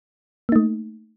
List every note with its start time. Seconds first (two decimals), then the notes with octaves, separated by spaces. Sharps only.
0.49 A#3
0.52 D#4
0.56 A3